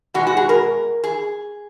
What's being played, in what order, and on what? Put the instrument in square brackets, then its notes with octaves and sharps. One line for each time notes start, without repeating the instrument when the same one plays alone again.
[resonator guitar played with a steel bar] B2 G#3 F#4
F#4
G#4
A#4
G#4